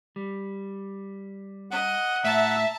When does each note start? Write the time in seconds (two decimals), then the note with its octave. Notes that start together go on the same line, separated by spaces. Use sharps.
0.16 G3
1.71 D#5 F#5
2.24 A2 E5 A5 A#5